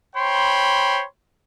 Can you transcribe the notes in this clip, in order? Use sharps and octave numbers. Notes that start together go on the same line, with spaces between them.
C5 C#5 G5 B5 C6